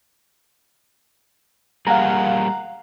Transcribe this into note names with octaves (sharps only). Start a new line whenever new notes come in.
G3 A#3 G#4 F5 F#5 A#5